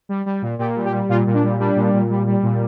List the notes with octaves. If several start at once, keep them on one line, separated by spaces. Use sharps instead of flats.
G3
G3
A#2
A#2 G4
G3
G4
G3
A#2 F4
A#2
D4
G3
G3 D4
A#2
A#2
G3
G3
A#2